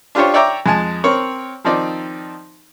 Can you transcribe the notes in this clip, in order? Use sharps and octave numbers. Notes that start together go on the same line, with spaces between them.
D4 F4 G4 C5 C#5
C#5 D5 E5 G5 A#5 D6
F2 G#3 G#5 A5
C4 A#4 C#5
D#3 F3 C4 D#4 D5